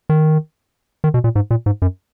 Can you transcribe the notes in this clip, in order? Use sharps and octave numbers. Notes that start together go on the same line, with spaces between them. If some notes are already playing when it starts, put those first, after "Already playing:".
D#3
D#3
B2
A#2
G#2
A#2
G#2
F#2